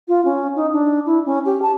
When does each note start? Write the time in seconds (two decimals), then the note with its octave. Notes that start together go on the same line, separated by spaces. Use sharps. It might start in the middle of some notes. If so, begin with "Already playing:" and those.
0.08 F4
0.25 C#4
0.56 D#4
0.73 D4
1.06 E4
1.26 C#4
1.45 G4
1.62 A5